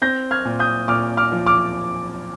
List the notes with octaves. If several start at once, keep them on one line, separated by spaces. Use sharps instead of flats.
C4 G6 A#6
F6 G#6
A#2
D#6 G6
A#2 D6 F6
D6 F6
F3
D6 F6